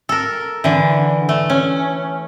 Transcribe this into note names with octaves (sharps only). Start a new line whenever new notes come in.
A4 A#4
D3 E3
A3
C#4